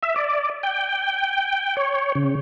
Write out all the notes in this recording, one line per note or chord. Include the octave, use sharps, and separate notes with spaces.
E5
D5
G5
C#5
C#3